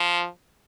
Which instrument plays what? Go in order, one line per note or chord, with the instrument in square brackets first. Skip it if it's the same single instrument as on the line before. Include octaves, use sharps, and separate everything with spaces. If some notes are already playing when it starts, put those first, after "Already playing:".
Already playing: [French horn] F3